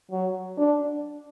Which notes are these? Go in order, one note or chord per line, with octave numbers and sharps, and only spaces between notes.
F#3
D4